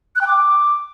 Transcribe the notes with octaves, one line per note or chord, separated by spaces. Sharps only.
F#6
G5
D6